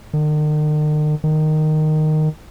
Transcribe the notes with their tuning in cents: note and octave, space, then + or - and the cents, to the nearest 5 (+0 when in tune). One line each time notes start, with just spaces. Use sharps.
D#3 -45
D#3 -10